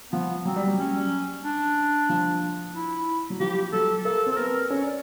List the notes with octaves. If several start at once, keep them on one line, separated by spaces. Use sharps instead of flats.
F3 B3
F#3 C4
G3
F#3
F#3 C#4
D4
F3
E4
F#3
F3 G4
F#3 A4
A#3 A4
C4
A4
B3 A#4
C#4 C#5
D5